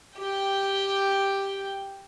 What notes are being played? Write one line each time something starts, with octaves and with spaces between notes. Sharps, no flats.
G4 G5